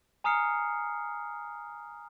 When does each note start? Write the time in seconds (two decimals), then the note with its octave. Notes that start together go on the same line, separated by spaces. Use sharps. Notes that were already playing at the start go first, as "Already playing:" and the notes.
0.24 G#5 A#5 D#6 F6 C7 C#7